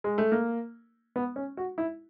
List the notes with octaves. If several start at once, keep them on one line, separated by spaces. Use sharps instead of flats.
G#3
A3
A#3
B3
C#4
F#4
E4